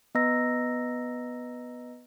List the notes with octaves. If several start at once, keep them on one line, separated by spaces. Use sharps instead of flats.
B3 B4 D#5 A#5 E6 A#6